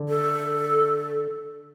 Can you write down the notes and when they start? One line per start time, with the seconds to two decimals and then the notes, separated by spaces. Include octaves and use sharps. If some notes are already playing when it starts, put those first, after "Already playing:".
Already playing: D3
0.09 A4